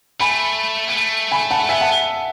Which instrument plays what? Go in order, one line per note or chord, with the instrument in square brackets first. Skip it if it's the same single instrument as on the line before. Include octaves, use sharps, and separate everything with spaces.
[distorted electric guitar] A3 [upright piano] G#5 B5
[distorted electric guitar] B3
A3
[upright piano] G#5 B5
F#5 A5
[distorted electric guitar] B3 [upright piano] E5 G#5
[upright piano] F#5 A5